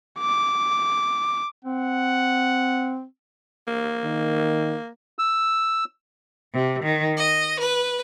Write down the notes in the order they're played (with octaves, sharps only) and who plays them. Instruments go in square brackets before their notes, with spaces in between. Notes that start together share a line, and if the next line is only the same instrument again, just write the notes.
[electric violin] D6
[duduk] C4 [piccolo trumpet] F#5
[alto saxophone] A#3
[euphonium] D#3
[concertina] E6
[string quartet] C3
D#3
D#5
B4